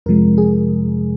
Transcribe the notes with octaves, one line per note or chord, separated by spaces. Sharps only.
F2 C3 F3 G#3 A#4
G#4